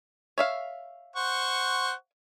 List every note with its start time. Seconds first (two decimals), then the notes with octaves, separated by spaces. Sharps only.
0.38 C#5 E5 F5
1.16 C5 F#5 C#6